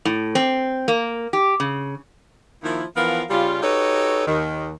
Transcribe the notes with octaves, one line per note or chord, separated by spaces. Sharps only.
A2
C4
A#3
G4
C#3
D#3 F3 A#3 E4
E3 F3 B3 A#4 F5
C#3 G3 F4
D#4 F#4 G4 A4 B4 C#5
D#2 D#3